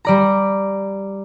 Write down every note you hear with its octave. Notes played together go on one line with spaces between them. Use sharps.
G3 D5 A#5